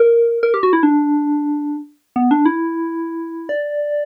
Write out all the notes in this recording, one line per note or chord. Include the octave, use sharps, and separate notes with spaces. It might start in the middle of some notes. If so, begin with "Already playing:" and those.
Already playing: A#4
A#4
G4
F#4
E4
D4
B3
D4
E4
D5